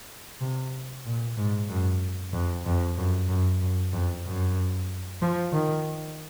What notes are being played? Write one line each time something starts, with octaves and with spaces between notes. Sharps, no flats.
C3
A#2
G#2
F#2
F2
F2
F#2
F#2
F#2
F2
F#2
F3
D#3